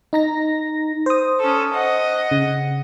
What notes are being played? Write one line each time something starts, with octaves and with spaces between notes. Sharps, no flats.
D#4 A#5 A#6
C5 D#6
C#4 A4
D#5 F#5
C#3